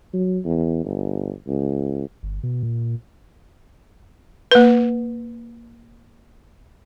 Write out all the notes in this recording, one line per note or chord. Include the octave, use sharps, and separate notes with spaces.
F#3
E2
G1
C#2
G1
B2
A#2
A#3 B4